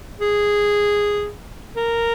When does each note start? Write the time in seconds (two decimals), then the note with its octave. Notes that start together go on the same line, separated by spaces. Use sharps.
0.21 G#4
1.77 A#4